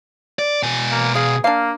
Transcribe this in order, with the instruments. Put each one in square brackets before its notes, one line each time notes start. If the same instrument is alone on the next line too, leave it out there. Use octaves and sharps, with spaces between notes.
[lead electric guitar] D5
B2 G#5
[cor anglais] A#3
[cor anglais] G#4 [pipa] F5
[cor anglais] A#3 [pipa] D4 F5